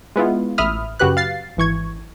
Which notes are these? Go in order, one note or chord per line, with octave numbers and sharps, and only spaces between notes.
G#3 B3 E4 F4
A1 E5 B5 D#6 F6
F#2 C#3 F#4 G4 B4 F#6
F5 A6 C7
G#1 E3 C#6 G#6